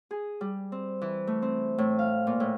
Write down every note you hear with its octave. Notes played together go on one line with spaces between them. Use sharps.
G#4
G3
C4
E3
A3
C4
A2
F5
A#2
A2